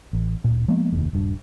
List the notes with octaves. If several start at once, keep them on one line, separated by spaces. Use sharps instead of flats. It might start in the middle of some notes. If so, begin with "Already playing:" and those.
A1
D1 A#2
F3 G#3 A#3 B3
F1 D#2
D#1 G2